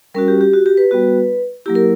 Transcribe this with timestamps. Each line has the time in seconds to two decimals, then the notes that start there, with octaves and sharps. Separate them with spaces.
0.14 G3 C#4 F#4 A#4
0.28 G4
0.41 G4
0.53 F#4
0.66 G4
0.77 B4
0.91 G3 B3 F#4
1.66 F#3 A#3 E4 G4
1.75 A#4